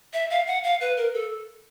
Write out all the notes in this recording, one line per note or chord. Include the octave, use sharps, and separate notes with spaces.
E5
F5
F#5
F5
B4
A#4
A4